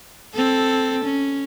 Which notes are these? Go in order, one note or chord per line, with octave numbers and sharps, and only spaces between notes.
C4 A4
C#4